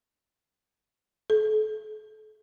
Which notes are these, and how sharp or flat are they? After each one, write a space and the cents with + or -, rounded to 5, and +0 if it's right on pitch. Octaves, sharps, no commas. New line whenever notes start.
A4 -35